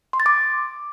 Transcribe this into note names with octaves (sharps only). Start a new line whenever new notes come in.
C6
A6
D6